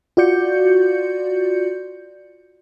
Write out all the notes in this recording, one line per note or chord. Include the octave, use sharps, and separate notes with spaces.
F4 F#4 D5 G6 C#7